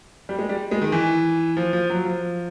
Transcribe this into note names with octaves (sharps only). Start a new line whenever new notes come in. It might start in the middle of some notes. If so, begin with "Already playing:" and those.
G3
G#3
G3
G#3
D#3
E3
F3
F3
F#3
F3